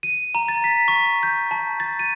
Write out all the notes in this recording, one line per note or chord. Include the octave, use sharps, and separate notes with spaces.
D#7
A#5
A6
B6
C#6
G6
A5
A6
D#7